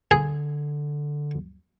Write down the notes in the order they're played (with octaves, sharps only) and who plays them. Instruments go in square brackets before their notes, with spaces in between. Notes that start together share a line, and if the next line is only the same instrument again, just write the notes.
[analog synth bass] D3 [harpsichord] G#4